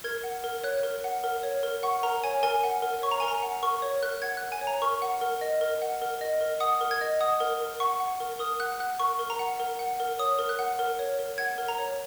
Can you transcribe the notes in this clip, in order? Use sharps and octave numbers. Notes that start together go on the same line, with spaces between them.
A#4 G#6
F#5
A#4
C#5 F#6
A#4
F#5
A#4
C#5
A#4
F#5 C#6
A#4 A#5
C#5 G#5
A#4 G#5
F#5
A#4
C#5 C#6
A#5
A#4 G#5
A#5
F#5
A#4 C#6
C#5
A#4 F#6
F#5 G#6
A#4 F#6
G#5
C#5
A#5
A#4 C#6
F#5
A#4
D#5
A#4
F#5
A#4
D#5
A#4
F#5 D#6
A#4
G#6
D#5
F#5 D#6
A#4
A#4
F#5 C#6
F#5
A#4
A#4 D#6
F#5 F#6
F#5 F#6
A#4 C#6
A#4
A#5
F#5
A#4
F#5
A#4
C#5 D#6
A#4
F#6
F#5
A#4
C#5
A#4
F#5 G#6
A#4
A#5
C#5